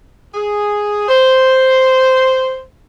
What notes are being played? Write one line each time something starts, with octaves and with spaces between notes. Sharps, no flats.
G#4
C5